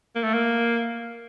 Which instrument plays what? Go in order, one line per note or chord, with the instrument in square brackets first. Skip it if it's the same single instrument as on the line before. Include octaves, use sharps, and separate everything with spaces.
[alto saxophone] A#3
A3
A#3